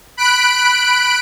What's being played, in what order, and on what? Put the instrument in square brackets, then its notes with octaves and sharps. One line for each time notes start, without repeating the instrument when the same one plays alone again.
[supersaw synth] B5 F#6 D7